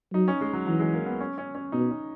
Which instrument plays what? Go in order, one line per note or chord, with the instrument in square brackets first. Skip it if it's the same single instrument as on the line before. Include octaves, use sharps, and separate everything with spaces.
[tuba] F#3 [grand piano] D#4
[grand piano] C#4
G#3
F#3
[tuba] E3 [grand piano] F#3
[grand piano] G#3
A#3
B3
C#4
C#4
C#4
[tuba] B2 [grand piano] D#4
[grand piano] C#4